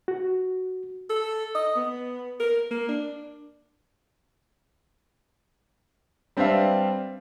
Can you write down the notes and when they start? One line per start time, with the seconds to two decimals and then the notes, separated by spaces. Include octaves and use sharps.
0.08 F#4
1.10 A4
1.55 D#5
1.76 B3
2.40 A#4
2.70 A#3
2.89 D4
6.37 G3 C4 D4 B4 E5 F5